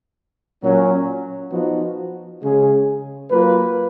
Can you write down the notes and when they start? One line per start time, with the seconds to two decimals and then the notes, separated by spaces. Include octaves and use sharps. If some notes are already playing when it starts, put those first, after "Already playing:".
0.62 A#2 F#3 C#4
1.51 F3 B3 D#4 F#4
2.42 C#3 G#3 C#4 G#4
3.31 F#3 A#3 F4 B4